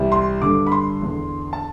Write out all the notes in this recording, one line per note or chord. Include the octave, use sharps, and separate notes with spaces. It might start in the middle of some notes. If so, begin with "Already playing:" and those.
Already playing: C2 C3 E3
C6
G2 D3 D6
B5
C6
E2 D3
A5